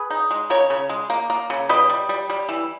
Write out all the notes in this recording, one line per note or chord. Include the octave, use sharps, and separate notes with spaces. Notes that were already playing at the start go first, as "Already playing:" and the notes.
Already playing: G#4 B4
D#4
G#3
C#3 A#4 C#5
C#3
G#3
A#3
A#3
C#3
G3 B4 D#5
G3
G3
G3
E3